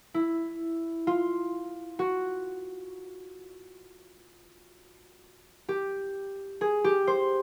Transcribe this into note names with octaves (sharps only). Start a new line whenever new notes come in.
E4
F4
F#4
G4
G#4
G4
C5